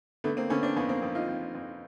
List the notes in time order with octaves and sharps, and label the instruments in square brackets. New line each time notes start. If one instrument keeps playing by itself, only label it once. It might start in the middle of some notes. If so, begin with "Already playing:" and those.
[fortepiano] D3 A3 B3
A#3 C4
D3 B3 C#4
C4 D4
F2 B3 C#4
A#3 C4
F2
D#4 F4
F2
F2